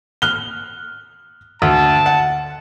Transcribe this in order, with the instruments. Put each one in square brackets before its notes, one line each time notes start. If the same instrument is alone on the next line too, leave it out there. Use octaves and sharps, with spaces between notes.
[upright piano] F6 F#6 G7
[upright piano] D2 [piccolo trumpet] A5
[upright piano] F#5